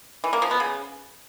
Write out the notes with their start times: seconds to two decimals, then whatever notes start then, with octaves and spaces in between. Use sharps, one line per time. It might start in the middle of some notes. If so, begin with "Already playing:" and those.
0.24 E3
0.33 A#3
0.42 F3
0.51 B3
0.60 C#3